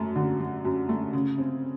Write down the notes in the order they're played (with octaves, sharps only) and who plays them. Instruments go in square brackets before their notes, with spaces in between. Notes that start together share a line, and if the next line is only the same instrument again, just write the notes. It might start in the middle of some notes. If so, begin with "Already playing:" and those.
Already playing: [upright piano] F#2 A3
D3
F#3
F#2
A3
C#3
C4